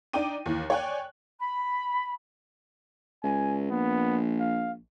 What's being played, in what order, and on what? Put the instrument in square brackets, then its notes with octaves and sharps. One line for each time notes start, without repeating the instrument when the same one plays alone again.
[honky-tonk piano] D4 D#4 D5 G5 D6 D#7
D#2 E3
C#5 D5 G5 G#5 F#6
[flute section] B5
[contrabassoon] C#2 [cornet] G#5
[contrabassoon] A#1 [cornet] B3
[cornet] F5